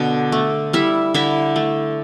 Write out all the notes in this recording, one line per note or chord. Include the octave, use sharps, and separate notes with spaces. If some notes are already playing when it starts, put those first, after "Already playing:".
Already playing: B2 D3
A3
G3 E4 E5
D3 E4 E5
A3